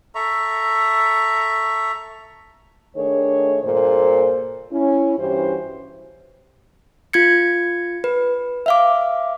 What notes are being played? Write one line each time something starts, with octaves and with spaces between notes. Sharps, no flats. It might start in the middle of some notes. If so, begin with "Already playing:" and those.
A4 E5 A#5 C#6
D#3 A3 D4 G#4 C#5
G2 A#2 G#4 A4 C5
C#4 E4
G2 E3 C#4 F#4 G4 C5
F4 G#6 C#7
B4
E5 F5 D6